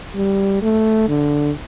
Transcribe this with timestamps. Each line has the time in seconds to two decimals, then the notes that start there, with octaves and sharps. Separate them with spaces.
0.16 G3
0.62 A3
1.09 D3